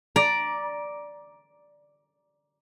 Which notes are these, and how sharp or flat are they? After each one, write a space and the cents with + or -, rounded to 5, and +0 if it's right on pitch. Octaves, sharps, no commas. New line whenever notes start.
D5 +0 A#5 +20